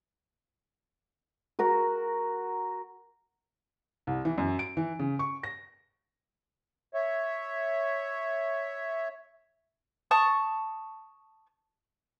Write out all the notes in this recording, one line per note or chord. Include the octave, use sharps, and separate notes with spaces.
F#4 A#4 A#5
C2
E3
F#2
D7
E3
C#3
C#6
A#6
C#5 E5
A5 C#6 D#6